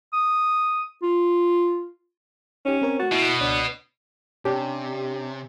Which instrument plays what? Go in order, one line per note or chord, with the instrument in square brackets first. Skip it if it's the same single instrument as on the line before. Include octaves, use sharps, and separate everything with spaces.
[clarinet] D#6
F4
[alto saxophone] C#4 [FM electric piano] D#4 G4
[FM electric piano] C4 A#4 C#5
[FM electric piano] A3 A6 [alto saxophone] F#4
[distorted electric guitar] B2 [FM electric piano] E4
[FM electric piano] C#2 C#5 [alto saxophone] D4
[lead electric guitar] C3 [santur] C#4 [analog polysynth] D4 G4